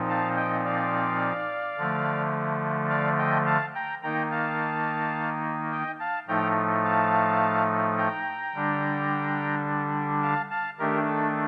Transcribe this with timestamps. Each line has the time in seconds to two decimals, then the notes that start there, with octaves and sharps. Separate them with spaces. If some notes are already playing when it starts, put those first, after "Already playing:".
Already playing: A#2 F3 C4 D#4
0.09 F5 A5
0.36 D#5 G5
0.65 D5 F5
1.78 D3 F3 A3
2.90 D5 F5
3.18 D#5 G5
3.46 F5 A5
3.74 G5 A#5
4.02 D#3 A#3 D#4 G5 A#5
4.31 F5 A5
5.71 D#5 G5
5.99 F5 A5
6.28 A2 F3 A3 D#4 G5 A#5
6.84 F5 A5
7.97 G5 A#5
8.54 D3 G3 D4
10.22 F5 A5
10.50 F5 A5
10.78 D#3 A3 D4 G4 A#4
11.07 A4